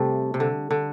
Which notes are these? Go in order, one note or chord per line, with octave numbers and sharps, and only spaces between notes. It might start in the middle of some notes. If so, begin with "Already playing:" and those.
Already playing: C3 G3 A3
C3
D3
D3